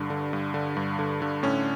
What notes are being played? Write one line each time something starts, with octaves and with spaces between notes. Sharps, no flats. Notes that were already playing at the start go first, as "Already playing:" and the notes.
Already playing: G2 D3
D3
G2
D3
G2
D3
D3
A2 C#4